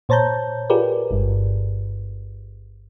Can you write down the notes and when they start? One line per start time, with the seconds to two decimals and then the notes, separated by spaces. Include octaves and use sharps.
0.09 A#2 C5 C#5 A5 A#5 G6
0.70 F4 G4 G#4 A#4 B4 D5
1.11 G1 G2